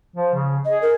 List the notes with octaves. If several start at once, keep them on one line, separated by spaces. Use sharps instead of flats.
F3
C#3
G#4 D#5
A#4